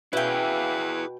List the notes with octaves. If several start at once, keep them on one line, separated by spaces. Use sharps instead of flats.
B2 C#4 E4 G#4 B4 E5 F5 G5